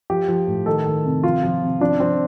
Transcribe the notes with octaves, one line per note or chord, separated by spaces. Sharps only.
F3 G4
F3
A2
D#3 A4
D#3
C3
F3 F4
F3
C3
F3 D4
F3 C4